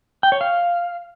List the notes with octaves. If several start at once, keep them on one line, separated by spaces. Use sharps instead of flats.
G5
C#5
F5